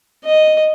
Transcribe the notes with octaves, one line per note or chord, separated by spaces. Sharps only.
D#5